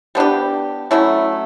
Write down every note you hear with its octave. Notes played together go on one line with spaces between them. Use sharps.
G3 B3 D4 G4
F#3 A3 C#4 E4